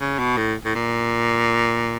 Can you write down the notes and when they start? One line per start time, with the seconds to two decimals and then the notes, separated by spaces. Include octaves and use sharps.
0.01 C#3
0.19 B2
0.37 A2
0.65 A2
0.75 A#2